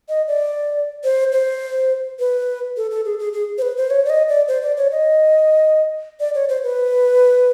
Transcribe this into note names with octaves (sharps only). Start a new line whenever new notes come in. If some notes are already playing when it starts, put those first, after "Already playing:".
D#5
D5
C5
C5
B4
A4
A4
G#4
G#4
G#4
C5
B4
C5
C#5
D5
D#5
D5
C5
D5
C#5
D#5
D5
C#5
C5
B4